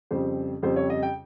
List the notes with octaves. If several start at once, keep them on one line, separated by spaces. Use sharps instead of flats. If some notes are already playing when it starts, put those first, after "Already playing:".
F2 C#3 G3 C5
F2 C#3 G3 C5
C#5
D#5
G5